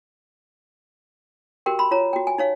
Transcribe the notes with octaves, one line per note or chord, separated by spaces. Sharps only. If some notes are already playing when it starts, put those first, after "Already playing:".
F#4 G4 A#4 G5 C6
B5 C6
F4 C#5 A#5
F#4 G5
G#5
D#4 C#5 F5